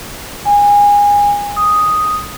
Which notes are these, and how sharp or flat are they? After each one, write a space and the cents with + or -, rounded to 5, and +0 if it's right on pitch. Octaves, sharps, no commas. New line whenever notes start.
G#5 -25
D#6 +0